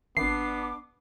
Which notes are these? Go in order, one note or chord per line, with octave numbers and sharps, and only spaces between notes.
G#1 B3 D4 D6 C7